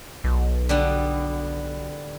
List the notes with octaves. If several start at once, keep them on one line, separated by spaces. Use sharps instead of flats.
B1
D3 G3 B3